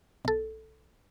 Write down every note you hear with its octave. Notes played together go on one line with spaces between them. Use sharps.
B1 A4